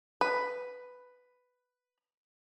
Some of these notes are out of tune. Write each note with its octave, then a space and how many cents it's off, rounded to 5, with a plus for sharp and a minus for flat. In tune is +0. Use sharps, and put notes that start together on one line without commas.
B4 +5